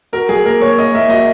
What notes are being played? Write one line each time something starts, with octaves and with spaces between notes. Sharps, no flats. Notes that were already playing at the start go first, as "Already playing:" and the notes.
F#4 A#4
F#3 G#4
A#3 A#4
A#3 C#5
A#3 D#5
A#3 E5
F#4 D#5